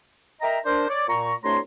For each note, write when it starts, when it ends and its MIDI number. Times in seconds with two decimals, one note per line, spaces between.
0.41 0.58 70
0.41 0.58 75
0.41 0.58 76
0.41 0.58 79
0.41 0.58 82
0.65 0.88 62
0.65 0.88 70
0.65 0.88 72
0.89 1.04 73
0.89 1.04 74
1.08 1.33 46
1.08 1.33 82
1.08 1.33 85
1.43 1.58 36
1.43 1.58 57
1.43 1.58 62
1.43 1.58 73
1.43 1.58 82
1.43 1.58 84